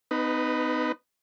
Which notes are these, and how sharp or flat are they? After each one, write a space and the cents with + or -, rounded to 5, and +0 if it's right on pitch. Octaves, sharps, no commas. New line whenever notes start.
B3 +40 D#4 -10 B4 +5